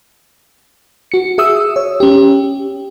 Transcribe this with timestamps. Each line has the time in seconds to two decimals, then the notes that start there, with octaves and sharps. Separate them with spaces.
1.12 F#4 C#7
1.38 G#4 E5 D#6 E6
1.76 C#5
2.00 C#4 G4